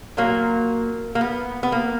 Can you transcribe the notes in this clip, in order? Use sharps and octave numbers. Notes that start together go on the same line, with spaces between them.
A#2 F#3 A#3
A#3
B3
B3
A#3